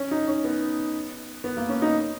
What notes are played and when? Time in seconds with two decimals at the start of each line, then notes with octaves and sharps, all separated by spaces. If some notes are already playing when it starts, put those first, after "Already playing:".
Already playing: C#4
0.11 D#4
0.28 C#4
0.44 B3
1.44 B3
1.57 A#3
1.69 C#4
1.82 D#4